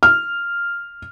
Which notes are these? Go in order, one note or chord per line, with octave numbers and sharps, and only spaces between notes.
F6